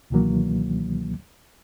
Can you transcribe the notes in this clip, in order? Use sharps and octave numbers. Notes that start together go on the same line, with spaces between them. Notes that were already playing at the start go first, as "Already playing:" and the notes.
C#2 B2 D#3 E3 F#3 A#3